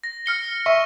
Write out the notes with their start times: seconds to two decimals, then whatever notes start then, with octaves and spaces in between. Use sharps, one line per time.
0.04 A#6
0.26 F6 C#7 G7
0.66 E5 C#6